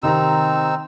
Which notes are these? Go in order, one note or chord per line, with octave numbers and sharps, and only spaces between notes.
C3 D#3 C4 D#4 A#5 E6